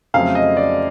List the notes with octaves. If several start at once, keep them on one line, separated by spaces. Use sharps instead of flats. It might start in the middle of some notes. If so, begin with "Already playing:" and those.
F2 C#3 F#3 A3 F5
D#5
D5